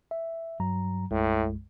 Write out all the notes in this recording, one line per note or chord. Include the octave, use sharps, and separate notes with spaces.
E5
G2 F#3 A#5
B1 F#2 A2 G#3